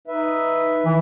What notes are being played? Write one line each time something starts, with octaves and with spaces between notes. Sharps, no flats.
D#4 B4 E5
E3